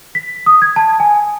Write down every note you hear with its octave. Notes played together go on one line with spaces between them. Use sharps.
B6
D#6
G#6
A5
G#5